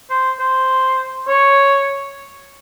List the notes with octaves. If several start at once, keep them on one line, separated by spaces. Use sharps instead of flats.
C5
C5
C#5